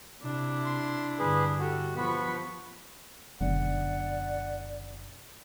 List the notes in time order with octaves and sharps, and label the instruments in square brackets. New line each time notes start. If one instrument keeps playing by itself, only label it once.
[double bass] C3 [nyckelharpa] D4 E4
[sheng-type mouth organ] C6
[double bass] G2 D3 [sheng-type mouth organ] G#4 B4
[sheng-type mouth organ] F#4 [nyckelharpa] G4 A4
[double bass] F3 [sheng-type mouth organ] B3 [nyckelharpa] B5 C#6
[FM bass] F#1 [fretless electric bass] F#2 B2 D3 [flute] D5 [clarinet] F#5